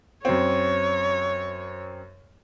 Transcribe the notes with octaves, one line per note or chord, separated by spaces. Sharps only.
F#2 C4 C#5